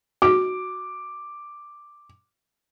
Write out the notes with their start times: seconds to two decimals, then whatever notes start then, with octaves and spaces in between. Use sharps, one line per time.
0.22 F#4 D6